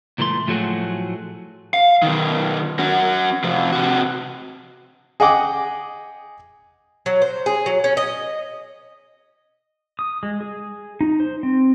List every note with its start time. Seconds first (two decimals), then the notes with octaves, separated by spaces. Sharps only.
0.18 C#2 A#2 E3 A3 C6
0.47 A2 F3 F#3 A3 F#4 G#4
1.74 F5
2.02 B2 D#3
2.79 C#4 F#4
3.44 C3 F3
3.73 C3 F#4
5.20 G#4 D#5 F#5 G5 D6 D#6
7.06 F#3
7.22 C5
7.46 G#4
7.66 F#3
7.84 C#4
7.97 D#5
9.99 D#6
10.23 G#3
10.41 G#4
11.01 D#4
11.20 C5
11.43 C4